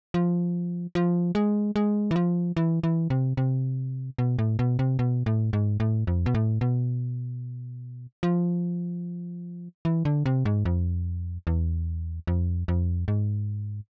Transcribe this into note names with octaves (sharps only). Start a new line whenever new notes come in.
F3
F3
G#3
G#3
E3
F3
E3
E3
C3
C3
B2
A2
B2
C3
B2
A2
G#2
A2
F2
B2
A2
B2
F3
E3
D3
C3
G#2
F2
E2
F2
F2
G#2